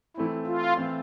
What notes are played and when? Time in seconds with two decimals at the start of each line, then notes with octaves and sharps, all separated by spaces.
0.17 E3 A3 C4 E4
0.47 F4
0.77 E3 A3 C4